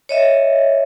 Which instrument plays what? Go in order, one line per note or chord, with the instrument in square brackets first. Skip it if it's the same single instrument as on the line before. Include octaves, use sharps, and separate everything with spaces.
[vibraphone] C#5 D#5 E5